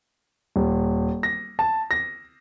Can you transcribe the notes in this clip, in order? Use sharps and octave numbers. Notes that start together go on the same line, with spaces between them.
D#1
A#6
A5
A#6